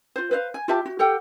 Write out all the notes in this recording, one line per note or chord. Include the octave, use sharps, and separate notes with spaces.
F4 C5
B4 C5 D#5 F5
G#5
F4 G4 E5 A5
F#4
G4 A4 F#5 G5